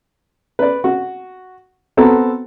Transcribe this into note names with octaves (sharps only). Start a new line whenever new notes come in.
B4 D5
F#4
B3 C4 F#4 A4 A#5